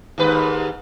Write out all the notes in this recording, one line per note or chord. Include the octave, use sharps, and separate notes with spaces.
D#2 G#2 B4